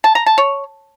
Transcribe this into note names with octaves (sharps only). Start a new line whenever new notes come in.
A5
A#5
A5
C#5